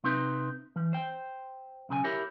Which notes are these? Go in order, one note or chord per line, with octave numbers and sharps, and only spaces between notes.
C3 C4 D#4 B4
E3
C5 G5
B1 C#3 A4 G#5
E4 G4 A#4 C#5